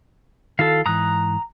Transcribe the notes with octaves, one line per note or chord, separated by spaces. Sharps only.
D#3 E4 F#4 A4 F5
G#2 E3 A#5 D#6 F#6